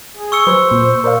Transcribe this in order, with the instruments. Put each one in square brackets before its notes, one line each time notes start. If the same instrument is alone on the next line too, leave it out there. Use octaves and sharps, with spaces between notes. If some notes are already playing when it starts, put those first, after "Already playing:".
[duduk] G#4
[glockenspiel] C#6 E6 C#7
[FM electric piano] F#3 B4 [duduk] C5
[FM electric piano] A#2
A#4 D5 F5